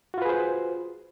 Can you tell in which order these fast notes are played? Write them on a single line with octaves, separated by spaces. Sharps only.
F#4 F4 B4 G#4 C5